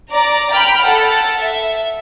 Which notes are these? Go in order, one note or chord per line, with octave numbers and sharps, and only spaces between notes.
D5 A#5
G5 B5 F6
A4 F#5
E5